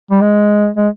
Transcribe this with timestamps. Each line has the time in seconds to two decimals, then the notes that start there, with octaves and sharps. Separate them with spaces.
0.11 G3
0.22 G#3
0.77 G#3